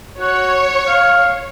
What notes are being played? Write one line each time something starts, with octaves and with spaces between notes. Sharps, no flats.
F#4 C#5
F5